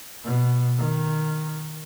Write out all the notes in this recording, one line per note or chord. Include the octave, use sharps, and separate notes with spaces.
B2
D#3